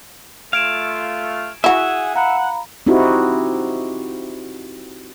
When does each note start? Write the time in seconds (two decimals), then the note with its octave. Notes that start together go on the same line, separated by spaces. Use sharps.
0.53 A3 F4 F5 G#6 D7 E7
1.64 E4 F#4 G#4 E5 F#5 G#5
2.14 F5 F#5 A#5 B5
2.87 C4 D#4 E4 F#4 G4